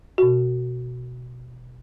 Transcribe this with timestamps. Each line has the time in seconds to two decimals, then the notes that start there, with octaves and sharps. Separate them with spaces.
0.18 B2 F#4